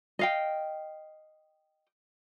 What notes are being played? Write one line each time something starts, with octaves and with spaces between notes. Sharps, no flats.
D#5 F5 G5